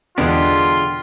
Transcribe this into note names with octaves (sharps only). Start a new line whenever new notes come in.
E2 B2 D3 G#3 B3 D4 F4 G4